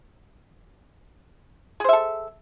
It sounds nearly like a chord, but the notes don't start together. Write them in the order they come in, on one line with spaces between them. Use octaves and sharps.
G#4 C5 E5 A4